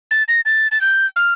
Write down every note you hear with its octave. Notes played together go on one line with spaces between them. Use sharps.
A6
A#6
A6
A6
G6
F6